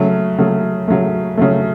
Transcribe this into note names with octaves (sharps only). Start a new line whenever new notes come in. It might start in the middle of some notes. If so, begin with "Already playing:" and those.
Already playing: C#3 F#3 A3
C#3 F#3 A3
C#3 F#3 A3
C#3 F#3 A3